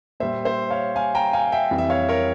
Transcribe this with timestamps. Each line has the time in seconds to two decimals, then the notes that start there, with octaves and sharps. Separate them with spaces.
0.20 A#2 G3 C5 E5
0.45 C5 E5
0.70 C#5 F5
0.96 F5 G#5
1.15 G5 A#5
1.33 F5 G#5
1.52 E5 G5
1.71 F2 E3 G3
1.78 E5
1.90 C#5 F5
2.08 A#4 C#5